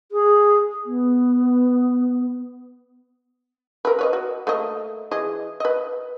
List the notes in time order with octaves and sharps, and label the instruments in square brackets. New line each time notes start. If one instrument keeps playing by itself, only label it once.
[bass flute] G#4
B3
[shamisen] A#4 B4
B4 C#5 D#5
F#4
A3 A#3 D#5
E3 G#4 D#5
B4 D#5